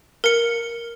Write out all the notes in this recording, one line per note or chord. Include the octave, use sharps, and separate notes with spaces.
A#4 C#7